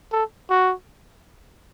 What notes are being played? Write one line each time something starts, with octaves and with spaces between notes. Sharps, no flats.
A4
F#4